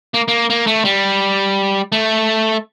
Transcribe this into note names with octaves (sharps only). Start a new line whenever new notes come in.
A#3
A#3
A#3
A3
G3
A3